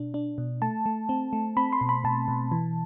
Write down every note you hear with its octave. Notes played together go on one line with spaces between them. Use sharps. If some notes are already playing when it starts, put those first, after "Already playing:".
Already playing: B2 D4
D4
B2
A3 A5
A3
C4
A3
C4 B5
C6
B2
B5
B2 A5
B2
E3